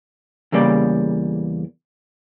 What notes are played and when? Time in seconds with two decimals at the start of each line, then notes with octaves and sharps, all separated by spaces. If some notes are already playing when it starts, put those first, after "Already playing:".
0.52 E2 C#3 G3 A#3 D5